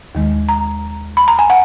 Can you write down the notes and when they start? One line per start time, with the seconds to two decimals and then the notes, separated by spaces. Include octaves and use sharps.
0.15 D#2 D#3 G#3
0.49 A#5
1.17 B5
1.28 A#5
1.39 G#5
1.50 F#5